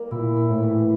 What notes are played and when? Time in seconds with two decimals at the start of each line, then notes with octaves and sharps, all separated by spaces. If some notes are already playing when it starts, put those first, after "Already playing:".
Already playing: G3 A#3
0.11 A#2 E4
0.36 E4
0.49 A2
0.63 E3